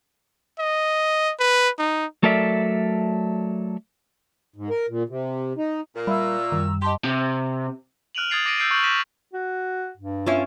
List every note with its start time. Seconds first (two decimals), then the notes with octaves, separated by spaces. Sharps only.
0.59 D#5
1.40 B4
1.79 D#4
2.22 F#3 A3 A4 A#4 D5 E5
4.56 G#2
4.70 A#4
4.89 A#2
5.09 C3
5.57 D#4
5.96 A#2
6.07 G3 E5 F5 A#5 B5 C#6 E6
6.52 F#2 D#3 G3
6.82 G4 D#5 A5 C6
7.04 C3
8.15 F6 F#6 D7 D#7 F7 F#7
8.30 D#6 G#6 A6 C7 D7 F7
8.46 D6 A#6 C7 D7 D#7
8.58 E6 G6 A6 C7 D7 D#7
8.71 C#6 F#6 G6 D7 F#7
8.83 G6 A#6 B6 D#7 E7
9.34 F#4
9.97 G2
10.26 C#4 E4 F4